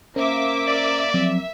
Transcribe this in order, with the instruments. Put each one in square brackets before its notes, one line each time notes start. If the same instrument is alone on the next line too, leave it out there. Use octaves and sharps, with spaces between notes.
[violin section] A#3 E5 D6 [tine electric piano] C#4 A#4 C5
[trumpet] D5
[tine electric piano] F3 F#3 C4 [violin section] E5